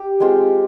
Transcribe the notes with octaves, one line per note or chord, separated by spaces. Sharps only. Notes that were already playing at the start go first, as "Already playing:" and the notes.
Already playing: G4
G#3 C4 F4